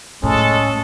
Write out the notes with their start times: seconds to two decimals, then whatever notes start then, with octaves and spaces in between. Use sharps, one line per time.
0.23 A2 G#3 C#4 A4